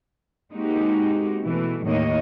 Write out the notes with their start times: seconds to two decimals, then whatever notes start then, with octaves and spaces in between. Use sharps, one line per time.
0.52 G#3 A#3 C4 D#4 F#4 G4
1.43 B2 E3 A3
1.86 D#2 A2 D#3 A#3 C#5 D#5